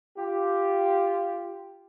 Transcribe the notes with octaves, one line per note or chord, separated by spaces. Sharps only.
F4 G4